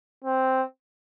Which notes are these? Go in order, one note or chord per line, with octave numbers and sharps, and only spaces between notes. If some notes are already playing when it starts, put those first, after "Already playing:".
C4